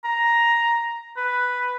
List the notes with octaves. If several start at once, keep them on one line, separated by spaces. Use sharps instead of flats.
A#5
B4